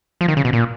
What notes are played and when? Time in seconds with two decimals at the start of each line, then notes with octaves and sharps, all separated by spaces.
0.21 F3
0.28 D#3
0.37 C#3
0.45 B2
0.53 A#2